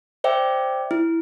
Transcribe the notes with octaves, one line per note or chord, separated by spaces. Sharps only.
C5 D5 E5 G5
E4